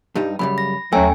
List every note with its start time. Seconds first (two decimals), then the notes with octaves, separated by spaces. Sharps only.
0.15 G2 G3 D#4
0.39 F#2 C#3 G3 B5
0.58 A#6
0.93 D#2 F#3 A3 C#4 G5 G#5 E6